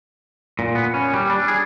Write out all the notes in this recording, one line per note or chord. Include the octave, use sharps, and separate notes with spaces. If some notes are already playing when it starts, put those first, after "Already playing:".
A#2
B3
C#4
G3
D4
G#4